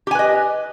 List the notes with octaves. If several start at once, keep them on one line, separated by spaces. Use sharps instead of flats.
G4 B4 D#5 G#5